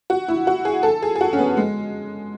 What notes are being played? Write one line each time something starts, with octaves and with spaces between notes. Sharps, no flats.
F#4
E4
F#4
G#4
A4
G#4
G#4
F#4
C#4
B3
G#3